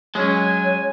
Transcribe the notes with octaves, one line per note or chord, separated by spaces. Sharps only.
F#3 G#3 C#4 C#5 G#5